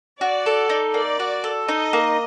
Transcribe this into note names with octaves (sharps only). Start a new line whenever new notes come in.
F#4 D5
A4
D#4
A#3 D5
F#4
A4
D#4 D#5
A#3